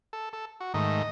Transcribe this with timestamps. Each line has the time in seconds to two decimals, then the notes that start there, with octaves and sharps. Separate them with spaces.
0.13 A4
0.33 A4
0.60 F#4
0.74 G#2 D#3 A3 D#5